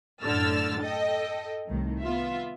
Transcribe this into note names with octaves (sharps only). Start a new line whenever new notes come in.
F#2 A2 D3 E6 F6 A6
A4 D#5 G5
C2 A2 D#3
B3 F4 E5